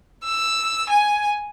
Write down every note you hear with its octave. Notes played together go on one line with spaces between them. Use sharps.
E6
G#5